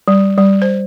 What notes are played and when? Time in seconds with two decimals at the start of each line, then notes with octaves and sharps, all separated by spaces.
0.08 G3
0.38 G3
0.62 C5